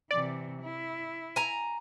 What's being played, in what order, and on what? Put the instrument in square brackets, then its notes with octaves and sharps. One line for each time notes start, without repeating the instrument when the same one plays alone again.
[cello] C3 E3 [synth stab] D5
[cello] E4
[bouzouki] G#5 A#5